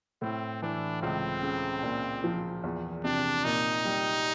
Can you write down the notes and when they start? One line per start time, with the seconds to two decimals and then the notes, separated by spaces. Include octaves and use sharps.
0.22 A2 C4
0.62 E3 D4
1.02 C#2 C4
1.43 C#3
1.83 A#2
2.24 F3
2.64 E2
3.04 C3 D4
3.44 A#2 D#4
3.85 G3